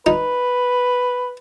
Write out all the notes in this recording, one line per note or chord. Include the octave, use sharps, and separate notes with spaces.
D#4 B4